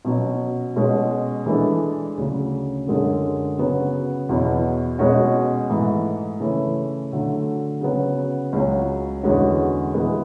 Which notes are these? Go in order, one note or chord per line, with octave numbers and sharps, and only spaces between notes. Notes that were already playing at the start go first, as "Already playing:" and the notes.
B2 F#3 C#4
B2 G#3 C#4
E3 G#3 D4 A4
D2 C#3 F#3
F#2 D3 G#3 C#4 G#4
C#3 F#3 B3
E2 B2 F#3
B2 G#3 C#4 F#4
G#2 E3 A3
C#3 E3 A3 C#4
D3 F#3 A3
C#3 F#3 B3
C#2 C#3 F#3
E2 D3 G#3 C#4 F#4
E3 G#3 B3